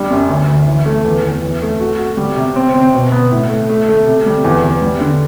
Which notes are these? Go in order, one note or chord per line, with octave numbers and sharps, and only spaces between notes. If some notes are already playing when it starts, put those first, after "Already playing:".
Already playing: G3 D4
F#2
D2
D2
E3
A3
E2
E2
E2
A3
F#4
F#4
G3
C3
C4
C4
B2
B3
A2
A3
A3
A3
C3
G3
E2
E2
G3
D3